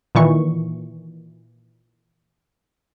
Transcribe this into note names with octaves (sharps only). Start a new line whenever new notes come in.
A#2 D#3 E3 C#6